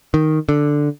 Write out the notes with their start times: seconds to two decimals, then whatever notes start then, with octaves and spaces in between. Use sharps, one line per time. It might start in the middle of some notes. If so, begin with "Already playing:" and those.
0.14 D#3
0.49 D3